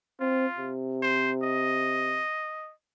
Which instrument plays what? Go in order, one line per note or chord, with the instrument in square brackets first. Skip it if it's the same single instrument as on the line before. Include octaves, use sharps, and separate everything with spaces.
[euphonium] C4 [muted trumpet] F4
[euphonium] C3
[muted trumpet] C5
D#5